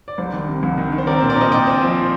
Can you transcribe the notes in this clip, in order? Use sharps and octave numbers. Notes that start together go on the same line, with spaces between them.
D5
C2 C5
D#3
C3
C2
D#3
D#3
C5
C4 A#4 D5
A#2 C5
A#4 D5
A#2 C5 D#5
A#2 D#5 G5
C4
F3